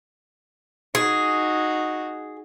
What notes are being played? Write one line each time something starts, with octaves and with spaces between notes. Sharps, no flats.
D#4 F#4 G#4